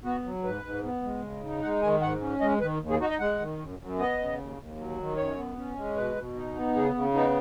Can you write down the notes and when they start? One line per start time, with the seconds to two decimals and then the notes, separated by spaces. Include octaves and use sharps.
0.04 B3 F#4
0.24 F#3
0.43 G#2 B4
0.63 G#2
0.83 B3
1.03 G#3
1.22 C#3
1.42 D#4
1.62 G#3 F#5
1.82 D#3 G#5
2.01 G#2 F#5
2.21 C#4
2.41 G#3 D#5
2.60 D#3 B4
2.80 D#2
2.90 G#4
3.00 D#4 F#4
3.10 D#5
3.20 G#3 F#5
3.39 D#3
3.59 F#2
3.79 F#2
3.99 B3 D#5
4.18 C#3
4.38 D#2
4.58 D#2
4.77 F#3
4.97 D#3
5.17 F#2 C#5
5.37 B3
5.56 C#4
5.76 G#3
5.96 B2 B4
6.16 B2
6.35 D#4
6.55 B3
6.75 C#3 G#4
6.95 C#3
7.14 B3 D#4